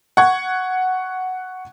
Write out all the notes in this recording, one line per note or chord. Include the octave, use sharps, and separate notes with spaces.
F#5 C#6 G#6